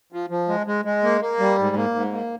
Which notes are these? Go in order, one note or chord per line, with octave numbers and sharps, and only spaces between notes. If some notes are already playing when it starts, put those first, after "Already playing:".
F3
F3
G#3
G#3
G#3
A#3
A#3
G3
G#2
A#3
G#2
A#3